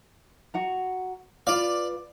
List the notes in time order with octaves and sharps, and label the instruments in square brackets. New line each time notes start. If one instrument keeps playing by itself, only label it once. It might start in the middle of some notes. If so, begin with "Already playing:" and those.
[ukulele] F#4 F#5 A#5
[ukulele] F4 B4 F5 [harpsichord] D5